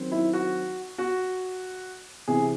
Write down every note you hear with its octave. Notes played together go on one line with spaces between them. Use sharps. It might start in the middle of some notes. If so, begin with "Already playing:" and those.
Already playing: D#3 F#3 C4
E4
F#4
F#4
C3 E3 C4 G#4